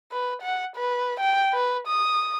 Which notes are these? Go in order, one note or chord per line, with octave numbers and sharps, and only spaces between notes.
B4
F#5
B4
G5
B4
D#6